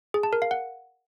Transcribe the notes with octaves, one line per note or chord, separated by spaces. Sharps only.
G#4
A5
A#4
F5
F#5